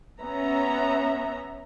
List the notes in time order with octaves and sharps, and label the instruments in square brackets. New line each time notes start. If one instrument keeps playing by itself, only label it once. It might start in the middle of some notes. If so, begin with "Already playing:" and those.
[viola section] B3 C#4 E5 A#5